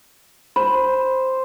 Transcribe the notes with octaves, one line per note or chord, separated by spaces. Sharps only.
C5 B5